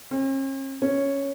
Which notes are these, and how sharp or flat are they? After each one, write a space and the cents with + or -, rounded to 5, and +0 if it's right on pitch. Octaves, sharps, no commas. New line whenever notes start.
C#4 -45
C#4 +0